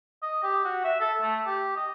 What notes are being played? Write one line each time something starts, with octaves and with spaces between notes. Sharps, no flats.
D#5
G4
F#4
E5
A4
A3
G4
D#5